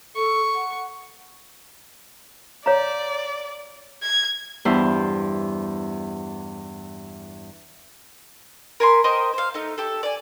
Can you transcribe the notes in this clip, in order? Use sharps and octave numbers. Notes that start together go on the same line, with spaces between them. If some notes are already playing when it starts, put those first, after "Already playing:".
A4 C#6
F#5
C#5 D5 F5 A#5
G#6
E2 G2 E4 C5
A#4 G#5 B5 C6
A#4 C5 D#5 G5
C5 F5
A3 D#4
G4 A4
D5 G#5